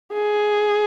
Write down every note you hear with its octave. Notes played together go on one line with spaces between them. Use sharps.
G#4